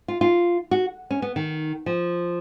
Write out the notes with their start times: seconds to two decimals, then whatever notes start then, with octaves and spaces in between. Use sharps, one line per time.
0.08 F4
0.21 F4
0.71 F#4
1.10 C#4
1.22 B3
1.36 D#3
1.86 F3